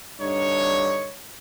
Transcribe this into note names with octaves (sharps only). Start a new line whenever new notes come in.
G2 D3 D#4 C#5